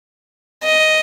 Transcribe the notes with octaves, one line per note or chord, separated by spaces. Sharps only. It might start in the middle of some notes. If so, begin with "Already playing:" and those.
D#5